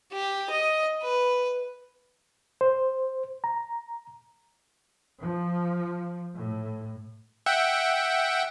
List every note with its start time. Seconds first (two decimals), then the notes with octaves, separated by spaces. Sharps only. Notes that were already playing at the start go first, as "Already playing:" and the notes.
0.13 G4
0.50 D#5
1.03 B4
2.61 C5
3.44 A#5
5.22 F3
6.35 A2
7.46 E5 F#5 G5